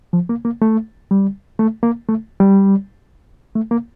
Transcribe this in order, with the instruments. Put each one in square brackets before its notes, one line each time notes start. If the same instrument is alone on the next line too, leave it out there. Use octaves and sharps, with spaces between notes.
[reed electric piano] F3
A#3
A#3
A3
G3
A3
A#3
A3
G3
A3
A#3